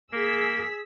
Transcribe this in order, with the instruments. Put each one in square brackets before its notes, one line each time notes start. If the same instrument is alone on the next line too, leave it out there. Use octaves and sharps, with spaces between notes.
[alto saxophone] A#3 [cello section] G#4 [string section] E6 B6